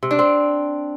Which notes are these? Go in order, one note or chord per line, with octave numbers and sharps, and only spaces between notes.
C3
D4
C4